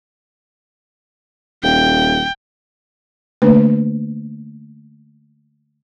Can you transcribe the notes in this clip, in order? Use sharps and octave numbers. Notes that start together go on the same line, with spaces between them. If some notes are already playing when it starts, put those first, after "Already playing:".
D#1 G5
D3 A3 A#3 D4 B4